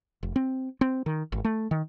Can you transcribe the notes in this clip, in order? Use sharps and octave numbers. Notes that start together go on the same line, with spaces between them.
F1
C4
C4
D#3
G#1
A3
D#3